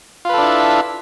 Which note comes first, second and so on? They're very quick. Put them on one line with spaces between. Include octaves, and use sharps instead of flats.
F4 B4 A4 D4 E4